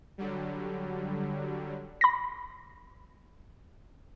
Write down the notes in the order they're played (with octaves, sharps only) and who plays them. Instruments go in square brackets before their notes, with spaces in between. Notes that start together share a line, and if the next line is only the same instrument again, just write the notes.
[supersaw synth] D3 F#3 G3
[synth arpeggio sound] B5 A#6